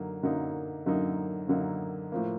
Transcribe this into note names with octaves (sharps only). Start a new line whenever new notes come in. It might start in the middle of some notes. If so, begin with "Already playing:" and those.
Already playing: F#2 D3 F#3 A#3 D#4
F#2 D3 F#3 A#3 D#4
F#2 D3 F#3 A#3 D#4
F#2 D3 F#3 A#3 D#4
A2 F3 A#3